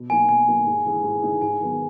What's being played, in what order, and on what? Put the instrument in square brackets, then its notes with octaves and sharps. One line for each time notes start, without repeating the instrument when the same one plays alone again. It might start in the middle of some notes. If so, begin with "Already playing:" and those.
Already playing: [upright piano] B2
[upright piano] F#3 A#3 D#4 F#4 [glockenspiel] G#5
[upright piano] B2 [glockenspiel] G#5
[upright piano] F#3 A#3 D#4 F#4
G#2
E3 G#3 D#4
G#2
E3 G#3 D#4
[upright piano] G#2 [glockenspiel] G#5
[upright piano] D#3 F#3 B3